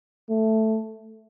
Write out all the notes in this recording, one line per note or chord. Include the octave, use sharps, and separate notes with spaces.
A3